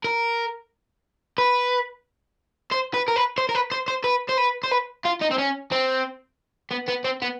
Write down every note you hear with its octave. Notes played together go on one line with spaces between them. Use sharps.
A#4
B4
C5
B4
A#4
B4
C5
A#4
B4
C5
C5
B4
C5
B4
C5
B4
F4
D#4
C4
C#4
C4
B3
B3
C4
B3